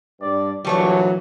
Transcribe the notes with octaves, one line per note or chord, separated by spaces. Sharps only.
G2 D5
D2 A#2 E3 F#3 G3 A3 C#5